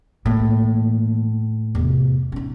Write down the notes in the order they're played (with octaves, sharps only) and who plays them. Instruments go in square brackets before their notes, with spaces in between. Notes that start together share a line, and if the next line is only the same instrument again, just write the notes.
[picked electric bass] A2 [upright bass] E3 A#3
[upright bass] E2 C3
C#4 D#4